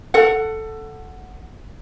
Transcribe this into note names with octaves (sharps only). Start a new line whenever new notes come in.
A4 F#5